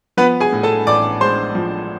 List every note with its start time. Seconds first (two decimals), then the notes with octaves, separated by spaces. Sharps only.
0.17 F3 B3 B4
0.40 G#4 G#5
0.53 A2
0.63 A4 A5
0.87 A1 D5 D6
1.21 G#3 C5 C6
1.55 F3